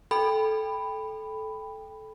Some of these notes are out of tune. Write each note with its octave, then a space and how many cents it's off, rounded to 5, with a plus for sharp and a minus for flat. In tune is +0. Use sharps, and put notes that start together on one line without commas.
A4 -15 G5 +20 B5 +5